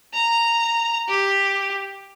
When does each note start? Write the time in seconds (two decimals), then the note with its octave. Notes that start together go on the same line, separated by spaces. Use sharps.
0.14 A#5
1.08 G4